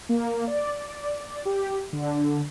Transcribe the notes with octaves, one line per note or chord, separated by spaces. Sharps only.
A#3
D5
G4
D3